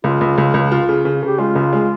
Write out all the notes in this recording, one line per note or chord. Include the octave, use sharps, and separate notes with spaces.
C#2 F4
C#2
C#2
C#2
F4
C#3
C#3
C#3 G4
G#3 F4
C#2
G#3